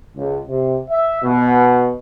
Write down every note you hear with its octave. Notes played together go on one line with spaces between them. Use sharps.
C#2
C3
E5
B2